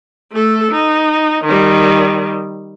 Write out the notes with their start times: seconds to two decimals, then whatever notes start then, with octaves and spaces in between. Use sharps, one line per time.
0.32 A3 A4
0.71 D#4
1.45 D#3 G3